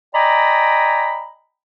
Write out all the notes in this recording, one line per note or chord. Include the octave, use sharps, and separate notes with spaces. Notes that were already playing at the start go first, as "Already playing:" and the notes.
D5 D#5 G5 G#5 A#5 B5